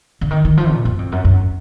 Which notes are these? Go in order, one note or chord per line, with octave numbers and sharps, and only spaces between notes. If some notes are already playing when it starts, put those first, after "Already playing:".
D3
D#3
D#3
F3
A#2
F#2
F2
F#2
F#2